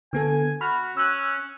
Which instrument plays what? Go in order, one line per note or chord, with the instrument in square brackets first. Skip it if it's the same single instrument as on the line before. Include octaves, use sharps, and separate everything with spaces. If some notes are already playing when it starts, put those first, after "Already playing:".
[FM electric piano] D3 B3 A4 [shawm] G#5
[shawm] F#4 [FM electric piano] B5 F6
[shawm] C#4 [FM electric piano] E6 F#6